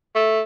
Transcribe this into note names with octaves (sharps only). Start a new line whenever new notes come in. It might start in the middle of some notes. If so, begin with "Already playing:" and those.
A3